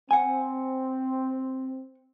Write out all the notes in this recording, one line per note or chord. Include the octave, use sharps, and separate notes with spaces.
C4 F#5 G#5